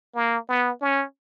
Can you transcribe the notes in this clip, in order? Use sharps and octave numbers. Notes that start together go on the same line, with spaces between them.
A#3
B3
C#4